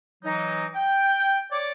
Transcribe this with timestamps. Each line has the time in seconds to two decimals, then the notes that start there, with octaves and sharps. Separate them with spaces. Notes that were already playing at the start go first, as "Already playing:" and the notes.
0.24 E3 F#3 D#4
0.74 G5
1.52 C#5 D5 D6